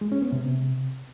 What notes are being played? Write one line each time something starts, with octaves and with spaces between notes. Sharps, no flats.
G#3
C#4
B3
C3